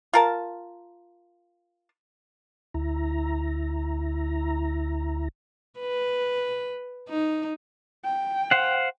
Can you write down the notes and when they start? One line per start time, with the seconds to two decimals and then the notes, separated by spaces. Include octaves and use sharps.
0.13 F4 A#4 A5
2.74 D2 E4 A#5
5.80 B4
7.09 D#4
8.04 G5
8.51 C5 F5 F#5